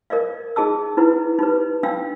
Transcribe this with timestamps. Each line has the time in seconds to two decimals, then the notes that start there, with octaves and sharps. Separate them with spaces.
0.10 A#4 D5 D#5 F5
0.56 D#4 G#4 D#5 A5 E6
0.97 D#4 E4 B4 F#5
1.39 D#4 G4 B4
1.83 D4 D#4 F5 G5 E6